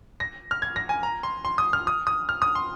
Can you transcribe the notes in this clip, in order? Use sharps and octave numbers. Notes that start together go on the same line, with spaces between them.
A#6
F6
G#6
A#6
G#5
A#5
C6
C6
D#6
F6
D#6
D#6
F6
D#6
C6